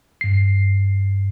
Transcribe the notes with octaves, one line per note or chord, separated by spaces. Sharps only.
G2 C7